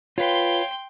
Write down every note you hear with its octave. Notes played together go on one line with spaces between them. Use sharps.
F4 B4 C#5 F5 G5 C6